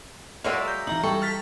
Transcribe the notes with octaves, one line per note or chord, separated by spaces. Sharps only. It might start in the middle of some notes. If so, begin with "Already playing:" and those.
F#3 G#3 A#3 C#5 D5 E5
G6
E3 D#4 A#5 F#7
G3 A4 G5 C#6
F6 A6 B6